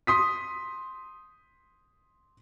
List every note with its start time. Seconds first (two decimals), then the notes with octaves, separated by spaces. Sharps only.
0.07 C6 D#6 B6